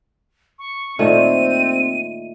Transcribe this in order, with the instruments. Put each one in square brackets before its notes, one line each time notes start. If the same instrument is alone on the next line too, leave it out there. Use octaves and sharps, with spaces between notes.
[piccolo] C#6
[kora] A#2 D#3 A3 [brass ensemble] C4 [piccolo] D#7